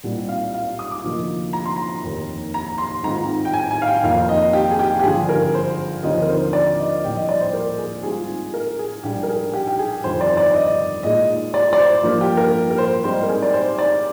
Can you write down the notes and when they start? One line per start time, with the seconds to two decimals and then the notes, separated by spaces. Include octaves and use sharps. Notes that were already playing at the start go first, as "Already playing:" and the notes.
0.04 C2 A#2 G3 C4 D#4
0.29 F5
0.54 F5
0.79 D#6
0.91 D6
1.04 D2 C3 F3 A#3 D#4
1.53 A#5
1.66 C6
1.77 A#5
2.03 F1 D#2 D#3 A#3
2.54 A#5
2.78 C6
3.03 G#2 D#3 G#3 C4 F4 A#5
3.45 G5
3.54 G#5
3.71 G#5
3.82 F5
3.87 G5
4.03 F1 F2 D#3 A#3 F5
4.29 D#5
4.53 G4
4.71 G#4
4.79 G4
4.99 G4
5.04 G#1 G2 D3 F3 G#4
5.29 A#4
5.54 C5
6.03 D#2 D3 F3 C4 D#5
6.22 A#4
6.29 C5
6.53 D5
6.78 D#5
7.04 C2 A#2 F3 A#3 G5
7.16 D#5
7.29 D5
7.41 C5
7.53 A#4
7.78 G#4
8.03 G#2 G3 C4 F4 G#4
8.54 A#4
8.79 G#4
9.04 A#1 G#2 G3 G4
9.23 A#4
9.29 G#4
9.53 G4
9.67 G4
9.79 G#4
10.04 G1 F2 D#3 C5
10.21 D5
10.30 C5
10.37 D5
10.54 D#5
11.03 A#2 G#3 D#4 D#5
11.54 D5
11.73 D5
11.79 C5
12.03 G2 F3 A#3
12.21 G4
12.37 A#4
12.70 A#4
12.78 C5
13.04 G#2 G3 C4 D#4 C5
13.23 A#4
13.29 G#4
13.42 D5
13.53 C5
13.79 D5